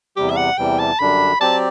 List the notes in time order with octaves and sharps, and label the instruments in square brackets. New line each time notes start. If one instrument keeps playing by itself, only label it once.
[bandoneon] E2 C3 G3 [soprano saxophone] G4
[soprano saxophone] E5
F#5
[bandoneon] E2 C3 E3 G3 [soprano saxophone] G5
[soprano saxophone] A5
[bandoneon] F#2 D3 G3 D4 [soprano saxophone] B5
[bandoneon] F#3 C4 G4 D5 [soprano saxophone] A5